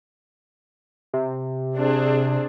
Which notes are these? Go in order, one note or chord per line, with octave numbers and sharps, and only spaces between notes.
C3
C4 D4 G#4